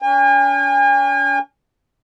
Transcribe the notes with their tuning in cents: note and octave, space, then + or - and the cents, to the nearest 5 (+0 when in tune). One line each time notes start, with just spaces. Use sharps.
C#4 +40 G#5 -40